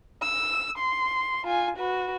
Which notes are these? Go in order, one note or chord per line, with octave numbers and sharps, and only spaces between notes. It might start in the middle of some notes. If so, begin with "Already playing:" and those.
E6
C6
F4 G#5
F#4 B4